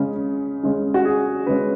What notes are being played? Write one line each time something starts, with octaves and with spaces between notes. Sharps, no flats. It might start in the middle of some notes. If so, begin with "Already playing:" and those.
Already playing: C#3 G#3 C#4
C#3 G#3 C#4
F#4
G#4
C#3 G#3 C#4 B4